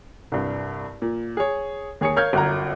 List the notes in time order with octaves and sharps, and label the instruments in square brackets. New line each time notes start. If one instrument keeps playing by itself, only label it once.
[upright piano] C2 G2
A#2
G#4 C#5
D#2 G#4 C#5 D#6 C#7
A#4 C#5 F5 F6 G6 G#6
G1 F#2 F#5 A#5